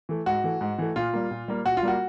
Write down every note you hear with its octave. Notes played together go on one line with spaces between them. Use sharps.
E3 A3
G#2 F#4
E3 A3
G#2
E3 A3
A#2 F4
G3 A#3
A#2
G3 A#3
A#2 F#4
F4
G3 A#3 F#4